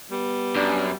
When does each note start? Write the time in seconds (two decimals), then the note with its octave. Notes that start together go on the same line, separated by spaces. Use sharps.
0.11 G3 B3
0.56 F#2 D4